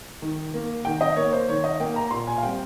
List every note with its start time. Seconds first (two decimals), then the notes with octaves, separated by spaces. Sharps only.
0.22 D#3
0.54 A#3
0.85 D#3 G5
1.01 D#5
1.16 A#3 C#5
1.33 C5
1.49 D#3 C#5
1.64 D#5
1.80 A#3 G5
1.96 A#5
2.11 A#2 C6
2.27 G#5
2.38 F5
2.43 G3 C4 G5